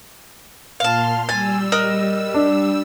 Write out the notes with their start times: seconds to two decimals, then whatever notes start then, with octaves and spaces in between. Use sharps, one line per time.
0.80 A#2 F5 A5 C6 F6
1.29 G3 G#5 E6 A6
1.72 A#4 D#5 F#6
2.34 D4